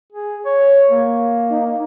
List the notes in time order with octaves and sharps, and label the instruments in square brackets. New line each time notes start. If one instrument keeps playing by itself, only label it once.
[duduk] G#4
C#5
A#3
[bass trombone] D#4